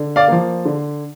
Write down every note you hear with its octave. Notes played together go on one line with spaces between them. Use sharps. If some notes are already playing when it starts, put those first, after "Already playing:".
Already playing: D3
D5 F5
F3 A#3
D3